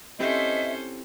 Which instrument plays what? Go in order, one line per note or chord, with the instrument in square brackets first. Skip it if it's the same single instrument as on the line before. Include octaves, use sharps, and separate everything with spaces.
[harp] C4 E4 G4 [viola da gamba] C#4 A4 C5 [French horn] D#5 [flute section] E5